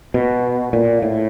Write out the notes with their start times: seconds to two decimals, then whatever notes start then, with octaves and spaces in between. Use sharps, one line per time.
0.14 B2
0.73 A#2
1.02 A2